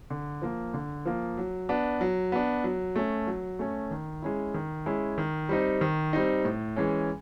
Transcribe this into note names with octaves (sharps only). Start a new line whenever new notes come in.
D3
F3 A#3
D3
F3 A#3
F#3
B3 D4
F#3
B3 D4
F#3
A3 C#4
F#3
A3 C#4
D#3
G#3 C#4 E4
D#3
G#3 C#4 E4
D#3
G3 C4 D#4
D#3
G3 C4 D#4
A2
E3 G#3 C#4